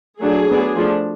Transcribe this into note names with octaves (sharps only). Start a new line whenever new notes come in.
F#3 A3 D4 G#4
F#3 B3 D4
F3 A3 D4